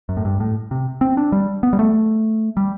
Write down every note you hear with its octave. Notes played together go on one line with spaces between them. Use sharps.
F#2
A2
G2
A2
C3
C4
D4
G3
B3
G3
A3
G3